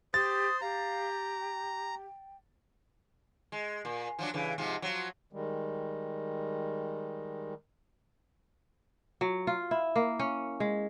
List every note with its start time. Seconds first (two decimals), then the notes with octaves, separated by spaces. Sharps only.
0.14 G4 C5 D#6 A6
0.61 G4 F5 A#5
1.39 G5
3.52 G#3
3.85 A#2
4.19 F3 F#3 D4
4.34 G2 C#3 E3
4.58 G#2 C3 F3
4.82 F3 F#3
5.33 D#3 G3 G#3
9.21 F#3
9.47 F4
9.71 E4
9.96 A#3
10.19 C#4
10.60 G#3